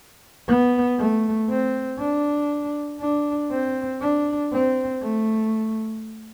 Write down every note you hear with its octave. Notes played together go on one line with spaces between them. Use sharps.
B3
A3
C4
D4
D4
C4
D4
C4
A3